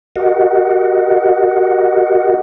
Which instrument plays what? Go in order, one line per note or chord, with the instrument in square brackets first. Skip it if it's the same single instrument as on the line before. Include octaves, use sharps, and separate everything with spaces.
[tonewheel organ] F#4 G4 A#4 D#5 F#5